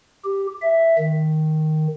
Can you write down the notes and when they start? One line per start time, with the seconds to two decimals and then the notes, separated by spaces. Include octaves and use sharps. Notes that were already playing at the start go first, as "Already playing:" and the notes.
0.24 G4
0.62 E5
0.98 D#3